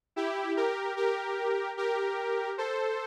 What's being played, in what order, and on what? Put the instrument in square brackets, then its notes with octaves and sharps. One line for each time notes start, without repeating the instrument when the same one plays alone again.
[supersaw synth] E4 G4
G4 A#4
G4 A#4
G4 A#4
A4 C5